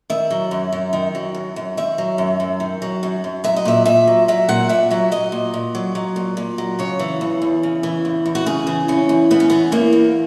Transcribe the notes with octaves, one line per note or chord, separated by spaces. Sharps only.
D#3 E5
F#3
F#2
F#2
D#3
F#3
F#2
F#2
D#3 E5
F#3
F#2
F#2
D#3
F#3
F#2
F#2
F#3 E5
D#5
A#2 E5
A#2 E5
F#3
F#3 E5
A#2 F#5
A#2 E5
F#3 E5
F#3 D#5
A#2
A#2
F#3
F#3
A#2
A#2
F#3
C#3 C#5
E3
E2
E2
C#3
E3
E2
E2
F#4
C#3 G#4
E3
E2 C#4
E2
C#3 B3
C#4
E3 B3
E2 A#3
E2